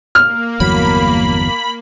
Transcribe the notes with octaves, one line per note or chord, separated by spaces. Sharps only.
A#3 F6
G1 E2 F#3 B5